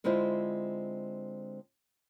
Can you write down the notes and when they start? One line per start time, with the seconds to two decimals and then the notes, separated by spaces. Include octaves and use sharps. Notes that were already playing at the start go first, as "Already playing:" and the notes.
0.04 D3 G#3 C4 E4 F4 C5